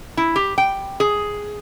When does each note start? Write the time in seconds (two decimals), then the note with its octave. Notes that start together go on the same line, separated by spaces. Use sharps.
0.17 E4
0.36 G4
0.58 G5
1.00 G#4